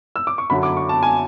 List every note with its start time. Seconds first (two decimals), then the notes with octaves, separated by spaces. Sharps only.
0.16 E6
0.27 D6
0.38 C#6
0.50 F#2 D3 F#3 B5
0.63 D6
0.77 C#6
0.89 A5
1.03 G#5